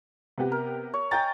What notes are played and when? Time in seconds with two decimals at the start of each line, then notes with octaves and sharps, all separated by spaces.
0.38 C3 B3 G4
0.52 A#4
0.94 C#5
1.11 D#5 G5 G#5 A#5 A6